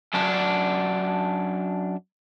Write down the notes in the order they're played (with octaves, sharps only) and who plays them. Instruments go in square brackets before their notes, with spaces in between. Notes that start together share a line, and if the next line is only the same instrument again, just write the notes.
[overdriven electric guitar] F#2 D4